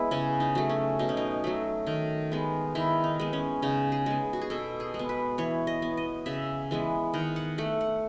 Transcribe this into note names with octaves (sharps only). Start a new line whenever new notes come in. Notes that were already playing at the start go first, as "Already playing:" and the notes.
Already playing: G#3 B3 E4
C#3 C#4
D#4
F#3 A3
C#4
B2 D#4
C#4
D#4
F#3 A3
D#3
G#3 B3
D#3 E4
D#4
G#3 B3
C#4
C#3 D#4
G#4
G#3 B3
F#4
G#4
B2 A4
G#4
G#3
B3
B4
E3 C#5
D#5
B3
D#5
C#3 E5
E3 G#3 B3
D#3 F#5
F#5
A3 F#5
F#5